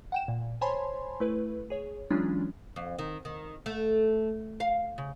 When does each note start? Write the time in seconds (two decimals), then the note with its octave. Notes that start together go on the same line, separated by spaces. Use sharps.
0.12 F#5 G5 E7
0.28 A#2
0.61 C5 C#5 G#5 A5 B5 C6
1.20 A3 E4 B4
1.70 G#4 C#5
2.10 E3 F#3 G#3 C#4 D4 F4
2.76 F2
2.99 D#3
3.25 D#3
3.66 A3
4.60 F5
4.98 C#3